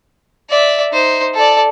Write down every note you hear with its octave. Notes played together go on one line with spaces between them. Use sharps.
D5 E5
D#4 C5
A4 D5